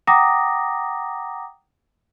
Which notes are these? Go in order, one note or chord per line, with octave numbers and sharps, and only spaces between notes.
F#5 G5 A#5 D6 D#6 A#6